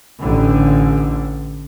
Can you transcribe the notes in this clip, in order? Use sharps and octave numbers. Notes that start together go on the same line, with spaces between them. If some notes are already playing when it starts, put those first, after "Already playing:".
A1 D3